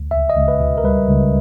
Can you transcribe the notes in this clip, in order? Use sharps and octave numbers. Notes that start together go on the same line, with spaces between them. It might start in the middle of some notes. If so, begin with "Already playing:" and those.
Already playing: D2
C#2 E5
D#5
C#2
B4
B2
A#4
G3 B4
C#2